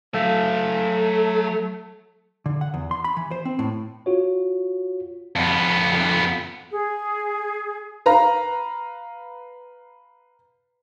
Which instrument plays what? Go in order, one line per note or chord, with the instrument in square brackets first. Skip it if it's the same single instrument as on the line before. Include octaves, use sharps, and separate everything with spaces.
[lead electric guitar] F#3 F5 [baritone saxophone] A3
[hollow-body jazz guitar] D3
F#5
E2
C6
B5
E3
C5
C4
A2
[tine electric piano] F4 F#4 C#5
[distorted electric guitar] F2 B3
[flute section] G#4
[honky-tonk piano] B4 F5 A#5